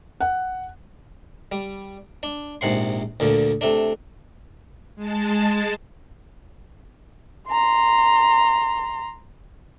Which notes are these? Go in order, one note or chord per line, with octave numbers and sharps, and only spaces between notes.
F#5
G3
D4
A#1 G#2 C3 F#5 C6
D2 A#2 D3
C3 A3 D4
G#3 A5
A#5 C6